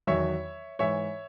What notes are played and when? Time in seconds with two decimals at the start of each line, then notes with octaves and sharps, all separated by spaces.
0.07 E2 D#3 F#3 C#5 E5
0.79 G#2 E3 C#5 E5